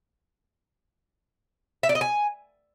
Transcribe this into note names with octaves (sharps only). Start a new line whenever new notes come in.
E5
D5
D#5
G#5